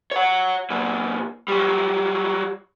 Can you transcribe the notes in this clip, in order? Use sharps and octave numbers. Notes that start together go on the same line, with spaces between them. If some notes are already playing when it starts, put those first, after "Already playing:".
C#5 F#5
A#2 F#3
F#3 G3